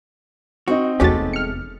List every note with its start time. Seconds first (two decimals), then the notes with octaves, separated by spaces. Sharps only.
0.68 C4 D#4 F#4
1.00 F1 E2 G#3 A3 C#4 F#4 G4 A6
1.33 F6 C#7